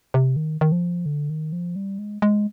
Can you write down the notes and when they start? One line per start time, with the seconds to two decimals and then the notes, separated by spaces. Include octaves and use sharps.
0.14 C3
0.36 D#3
0.61 D#3
0.72 F3
1.06 D3
1.30 D#3
1.52 F3
1.76 G3
1.99 G#3
2.22 G#3